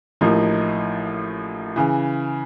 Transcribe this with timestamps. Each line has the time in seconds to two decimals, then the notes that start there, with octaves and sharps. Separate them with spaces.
0.21 A1 A2 F3 A#3 D#4
1.76 C#3 E3